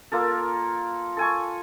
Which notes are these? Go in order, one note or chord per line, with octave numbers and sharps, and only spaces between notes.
A#3 F4 A4
A4 G#5 C#6